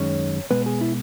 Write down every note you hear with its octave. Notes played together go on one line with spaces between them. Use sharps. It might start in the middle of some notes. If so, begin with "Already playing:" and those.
Already playing: F#2 D#3 G#3 C#4 C#5
B2 G#3 B3 B4
G#4
E4